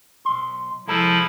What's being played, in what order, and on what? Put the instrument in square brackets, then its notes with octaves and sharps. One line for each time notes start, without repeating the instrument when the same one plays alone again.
[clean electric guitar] B1 C6
[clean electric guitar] C2 G#3 A4 [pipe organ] F3 E4